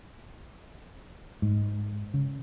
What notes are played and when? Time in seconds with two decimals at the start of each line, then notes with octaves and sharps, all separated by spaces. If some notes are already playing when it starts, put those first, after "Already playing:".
1.42 G#2
2.14 C#3